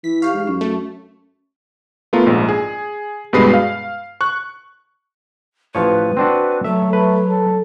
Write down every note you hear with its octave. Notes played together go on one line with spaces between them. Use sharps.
E3 B6
G4 F5 C#6
G#2
F#2 C#4
A3
A3 B3 F4 A#4
A#1 G#2
G#4
G2 B2 G#3 B4 C7
F5
C#6 F#6
A1 F3 B4 C#5
C4 D4 F#4
F#3 A3 E5
A3 B4
A4